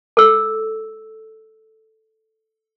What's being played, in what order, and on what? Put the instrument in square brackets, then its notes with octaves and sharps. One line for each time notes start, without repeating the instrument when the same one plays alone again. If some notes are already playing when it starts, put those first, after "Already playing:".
[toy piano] A4 E6